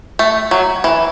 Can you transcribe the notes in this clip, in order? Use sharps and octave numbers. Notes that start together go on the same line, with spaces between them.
A3
F#3
E3